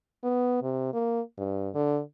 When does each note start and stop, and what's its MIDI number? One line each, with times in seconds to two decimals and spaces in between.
0.24 0.61 59
0.62 0.93 48
0.93 1.21 58
1.38 1.69 43
1.75 2.00 50